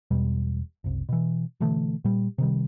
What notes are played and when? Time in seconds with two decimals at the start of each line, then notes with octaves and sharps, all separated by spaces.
0.11 E1 E2 B2 G3
0.84 F#1 C2
1.09 B2 E3
1.60 B2 D3 E3 A3
2.04 A#2 G3
2.38 C3 D#3 G3